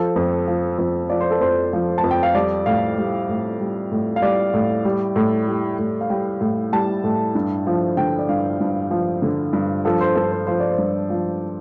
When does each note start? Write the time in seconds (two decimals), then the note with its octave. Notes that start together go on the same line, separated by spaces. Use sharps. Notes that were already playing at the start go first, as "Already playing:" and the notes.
Already playing: F3 A4
0.16 F2
0.48 F3
0.78 F2
1.10 F3 D5
1.21 C5
1.31 A4
1.41 F2 C5
1.73 F3
1.98 A5
2.04 F2
2.11 G5
2.23 F5
2.35 G3 D5
2.66 A2 F5
2.98 G3
3.29 A2
3.60 G3
3.91 A2
4.16 F5
4.22 G3 D5
4.54 A2
4.85 G3
5.16 A2
5.48 G3
5.78 A2
6.01 F5
6.10 G3 G5
6.41 A2
6.73 G3 A5
7.04 A2
7.35 G2
7.67 F3
7.97 D3 G5
8.19 D5
8.29 G2 F5
8.60 G2
8.91 F3
9.22 D3
9.53 G2
9.85 F3 A4
10.01 C5
10.15 G2 A4
10.32 C5
10.47 F3 C5
10.60 D5
10.72 C5
10.78 G2
11.10 F3